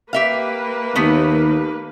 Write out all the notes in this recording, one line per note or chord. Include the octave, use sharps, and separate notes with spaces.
A#3 G4 B4 E5 F5
D#2 A3 B3